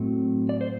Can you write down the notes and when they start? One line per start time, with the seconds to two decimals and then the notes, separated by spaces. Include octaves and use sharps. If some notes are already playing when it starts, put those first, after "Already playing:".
Already playing: A2 F#3 A3 C4
0.49 D5
0.61 C5